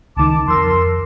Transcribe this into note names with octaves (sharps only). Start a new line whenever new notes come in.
C#2 D#3 A5 D6
F2 A#4 C6 E6